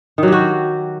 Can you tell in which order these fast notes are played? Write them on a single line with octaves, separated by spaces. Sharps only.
D#3 F#3 G4 F#4